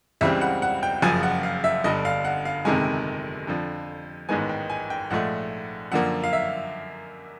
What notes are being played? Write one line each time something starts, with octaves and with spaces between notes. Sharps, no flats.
C#2 C#3 E3 G3 C4 E5
F#5
F#5
G5
F#1 F#2 C#3 F3 G#5
F#5
F5
E5
G1 G2 D3 D#5
F5
F#5
F5
G1 F2 C3 D#3 G#3 G#5
F2 D3 F3
A1 G#2 D#3 G#3 B3 G#5
G5
G#5
G5
A#1 G#2 F3 A3 F#5
F#2 D3 F3 A#3 F#5
F5
E5